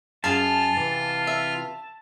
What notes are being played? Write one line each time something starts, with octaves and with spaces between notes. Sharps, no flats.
F#2 F4 G#4 G#5 A5 F6
C3 E3
E5